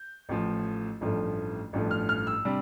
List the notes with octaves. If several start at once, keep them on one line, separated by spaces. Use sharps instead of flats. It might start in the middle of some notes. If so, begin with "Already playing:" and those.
Already playing: G6
A1 A2 F3
A1 G2 F3 A3
A1 G2 F3 A3
F6
F6
E6
C3 G3 D4